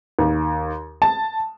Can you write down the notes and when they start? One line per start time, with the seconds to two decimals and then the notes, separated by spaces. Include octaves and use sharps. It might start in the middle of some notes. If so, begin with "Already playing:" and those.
0.19 D#2
1.02 A5